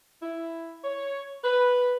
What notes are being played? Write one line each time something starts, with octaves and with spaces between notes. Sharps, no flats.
E4
C#5
B4